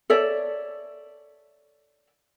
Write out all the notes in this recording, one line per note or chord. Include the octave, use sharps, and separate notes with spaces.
A4 C#5 D5 E5